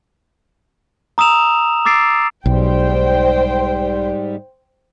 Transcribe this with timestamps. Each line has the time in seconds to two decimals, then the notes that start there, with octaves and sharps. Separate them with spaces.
1.18 A#5 D#6 E6 E7 F7
1.85 D6 E6 A6 C7 D7
2.46 B1 G#2 G3 C5 G5